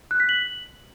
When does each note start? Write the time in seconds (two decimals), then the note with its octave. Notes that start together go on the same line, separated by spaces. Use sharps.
0.11 F#6
0.20 B6
0.29 F#7